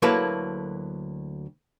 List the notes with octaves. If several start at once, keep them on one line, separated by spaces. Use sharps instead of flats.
D2 F#3 A#3 E4 A4 B4